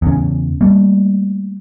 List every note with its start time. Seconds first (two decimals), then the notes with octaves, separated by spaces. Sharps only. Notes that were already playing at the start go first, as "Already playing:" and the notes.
0.02 E2 C#3
0.61 G3 A3 A#3